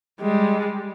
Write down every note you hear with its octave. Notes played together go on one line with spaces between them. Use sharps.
G3 G#3